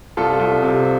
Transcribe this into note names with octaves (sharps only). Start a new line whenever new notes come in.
C2 F4 A4
C2
C3